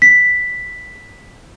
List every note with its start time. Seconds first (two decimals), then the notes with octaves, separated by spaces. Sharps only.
0.02 B6